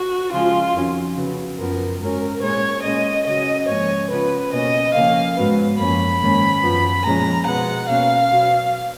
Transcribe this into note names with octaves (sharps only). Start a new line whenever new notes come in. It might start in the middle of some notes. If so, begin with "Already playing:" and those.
Already playing: F#4
C#3 F3 G#3 F4
F2 D#3 F#3 C#4
C#3 F#3 B3
F#2 F3 B3 A#4
G#2 F#3 C#4 A#4
A#2 G#3 C#4 C#5
A#2 G#3 C#4 D#5
C#3 F#3 C#4 D#5
G#2 F3 A#3 C#4 C#5
C#3 F3 B3 B4
B2 A#3 C#4 D#5
C#3 F3 A#3 C#4 F5
G#2 F#3 B3
F#2 F3 A#3 C#4 B5
G#2 D#3 A#3 C#4
F#2 F3 B3
A#2 F3 G#3 C#4 A#5
B2 G#3 B3 F#5
B2 A#3 C#4 F5
B2 F#3 B3